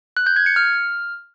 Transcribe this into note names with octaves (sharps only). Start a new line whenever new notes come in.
F#6
G6
G#6
C#7
F6